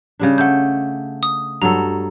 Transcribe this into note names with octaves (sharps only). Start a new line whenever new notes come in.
C#3 G3 D4
A3 F#5 G6
D#6
G2 F#3 A4 A#5